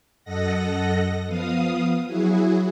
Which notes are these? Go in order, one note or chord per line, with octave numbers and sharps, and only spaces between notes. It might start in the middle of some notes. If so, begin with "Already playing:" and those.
F#2 A4 D#5 F#5 A#6
F3 B3 F5 D#6
F#3 E4 F#4 G#4